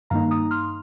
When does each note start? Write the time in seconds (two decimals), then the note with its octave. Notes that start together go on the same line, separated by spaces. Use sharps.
0.10 G2 D#3 A#3 D#4 F5 A#5
0.31 A#5 D#6
0.51 C6 F6